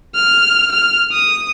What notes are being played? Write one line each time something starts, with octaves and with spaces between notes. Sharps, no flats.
F6
F6
D#6